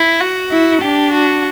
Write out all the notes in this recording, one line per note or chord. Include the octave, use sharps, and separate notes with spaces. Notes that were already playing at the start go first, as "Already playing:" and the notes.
Already playing: E4
F#4
E4
D4 G4
F#4